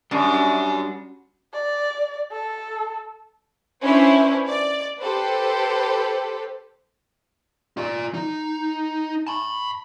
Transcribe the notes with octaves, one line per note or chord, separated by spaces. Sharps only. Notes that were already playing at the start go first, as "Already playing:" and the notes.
F#2 G3 D4 F#4
D5
A4
C#4 D4 E4 B4 C5
D5
G4 A4 B4 C5
F4 D5
D#4
A5 B5